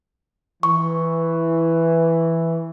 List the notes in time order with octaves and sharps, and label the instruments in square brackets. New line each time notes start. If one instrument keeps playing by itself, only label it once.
[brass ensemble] E3 [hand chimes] C#6